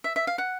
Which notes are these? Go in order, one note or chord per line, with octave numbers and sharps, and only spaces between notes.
E5
E5
F5
F#5